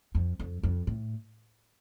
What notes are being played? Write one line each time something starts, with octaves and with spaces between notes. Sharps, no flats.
F2
F2
F2
A2